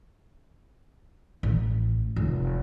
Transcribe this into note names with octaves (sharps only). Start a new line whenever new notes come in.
A1
F1